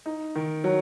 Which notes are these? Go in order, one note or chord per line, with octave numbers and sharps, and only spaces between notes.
D#4
D#3
F#3